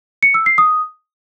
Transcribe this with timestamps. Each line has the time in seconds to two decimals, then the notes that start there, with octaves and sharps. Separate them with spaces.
0.23 C#7
0.34 E6
0.46 C7
0.58 D#6